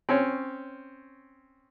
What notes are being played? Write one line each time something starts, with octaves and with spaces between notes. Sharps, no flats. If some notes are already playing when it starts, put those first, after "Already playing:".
C4 C#4 C#5